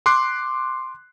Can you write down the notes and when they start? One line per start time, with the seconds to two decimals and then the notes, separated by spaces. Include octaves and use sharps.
0.06 C6 D6 F#6 C7